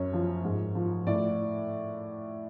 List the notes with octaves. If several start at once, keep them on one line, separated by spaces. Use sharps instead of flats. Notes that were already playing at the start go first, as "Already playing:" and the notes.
Already playing: F#2 C#5
F3
G#2
F3
A2 D5